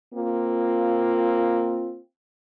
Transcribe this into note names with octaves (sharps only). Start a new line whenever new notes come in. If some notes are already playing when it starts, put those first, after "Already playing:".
A#3 C4 F4